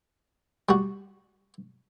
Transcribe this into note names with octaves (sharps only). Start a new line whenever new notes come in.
G3 F#4